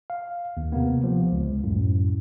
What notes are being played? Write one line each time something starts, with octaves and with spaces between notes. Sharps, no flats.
F5
D#2
C3 A#3 B3
F3
C#2
F#2 A2